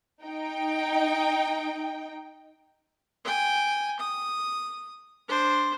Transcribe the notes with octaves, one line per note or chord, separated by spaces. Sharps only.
D#4 G5
G5 G#5
D#6
D4 C5